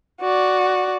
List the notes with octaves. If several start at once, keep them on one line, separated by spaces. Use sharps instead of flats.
F#4 D5